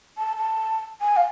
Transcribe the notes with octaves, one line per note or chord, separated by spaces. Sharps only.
A5
A5
G#5
F5